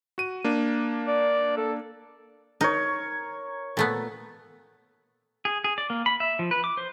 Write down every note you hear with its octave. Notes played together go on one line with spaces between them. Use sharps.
F#4 D#7
A#3 D4
D5
A4
D#4 A#4 C#5
A#2 A3 B3
G#4
G#4
D5
A#3
B5
E5
F3
B4
D6
C5